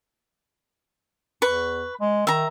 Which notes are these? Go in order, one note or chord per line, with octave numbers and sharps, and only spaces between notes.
E2 B4 C#6
G#3
D#3 E5 A#5